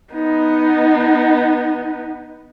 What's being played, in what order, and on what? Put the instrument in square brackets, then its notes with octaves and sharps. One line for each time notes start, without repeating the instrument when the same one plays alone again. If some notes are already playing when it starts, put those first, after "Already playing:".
[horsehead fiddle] B3 D#4